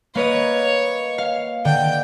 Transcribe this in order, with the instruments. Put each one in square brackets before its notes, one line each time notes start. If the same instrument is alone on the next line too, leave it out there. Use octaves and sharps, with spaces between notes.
[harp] A#3 B4 D#5 [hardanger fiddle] C#5
[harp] F5
[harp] D3 [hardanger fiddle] G5